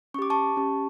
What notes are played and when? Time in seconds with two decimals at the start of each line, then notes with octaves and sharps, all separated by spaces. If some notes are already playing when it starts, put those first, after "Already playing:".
0.14 C#4 C#6
0.19 G4 D6
0.30 A5 C#6
0.57 C#4 G4